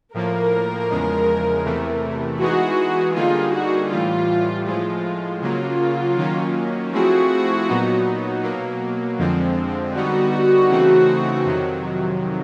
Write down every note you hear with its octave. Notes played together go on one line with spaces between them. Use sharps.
A2 F3 A#3 A#4
E2 C#3 F3 G#3
E2 C3 E3 A3
E3 G#3 B3 D#4 F#4 G#4
D3 G3 A#3 D#4 F4 G#4
F#4
A2 E3 G3 F4
A2 F3 G#3 F4
C#3 F#3 A#3 F4
D#3 F#3 A#3 C#4
F3 A3 C4 E4 F#4 G#4
A#2 F#3 B3 D#4
B2 F#3 A#3
F2 D3 F3 G#3 C4
D3 G3 B3 D#4 F#4
C#3 E3 A3 C4 D#4
F2 C3 D#3 F#3